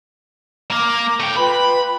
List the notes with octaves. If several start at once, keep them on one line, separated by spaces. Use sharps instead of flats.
A#3 A#4 D6
A3 G5
F4 B4 G5 B5